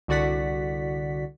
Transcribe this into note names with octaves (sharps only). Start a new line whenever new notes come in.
C2 D3 F#4 D5 F#5 B6